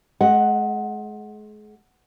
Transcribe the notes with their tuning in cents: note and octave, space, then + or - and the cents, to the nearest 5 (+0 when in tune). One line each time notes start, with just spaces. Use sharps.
G#3 +35 D#5 +0 F#5 +0